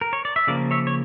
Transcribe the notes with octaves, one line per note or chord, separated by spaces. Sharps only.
A#4
C#5
D5
E5
C#3 F3 A#3 D5 F5
C#5 E5
C#5